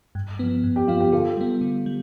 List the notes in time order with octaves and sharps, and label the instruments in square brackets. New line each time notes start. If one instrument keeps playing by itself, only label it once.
[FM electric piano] G2
F3 B3
G2
[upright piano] G4
[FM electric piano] F3 B3 [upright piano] F4
[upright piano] G4
[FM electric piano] D3 [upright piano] F4 A4
[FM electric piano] G3 B3
D3
G3